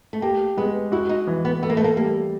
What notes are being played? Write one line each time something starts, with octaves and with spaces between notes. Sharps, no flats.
A3
A#3 G4
G#3 B3
E4 F#4
D#4
E3
B3
B3 A4
A#3
A3
A#3
G3 A#3